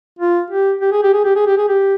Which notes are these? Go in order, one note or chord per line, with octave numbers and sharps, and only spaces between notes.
F4
G4
G4
G#4
G4
G#4
G4
G#4
G4
G#4
G4